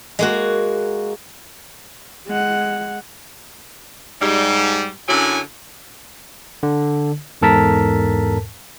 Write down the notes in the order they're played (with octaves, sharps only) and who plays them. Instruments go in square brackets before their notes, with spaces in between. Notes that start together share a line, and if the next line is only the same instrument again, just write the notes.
[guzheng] G#3 A#3 F#4
[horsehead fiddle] G#3 F#5
[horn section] G#2 G3
F#2 D3 F#3 E4 G#5
[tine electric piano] D3
E2 G#2 A4 A#4 A5 B6